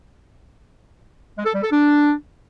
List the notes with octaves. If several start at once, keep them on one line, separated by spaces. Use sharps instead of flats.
G#3
A4
G3
A4
D4